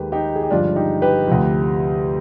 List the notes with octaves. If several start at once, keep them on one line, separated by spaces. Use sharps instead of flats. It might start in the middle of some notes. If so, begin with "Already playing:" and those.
Already playing: D#2 D#3 G#3 G4 B4
D#4 G4
G#4
G4
G1 G2 F3 G#3 D4 F4
D#4 G4
G4 B4
D2 C3 F3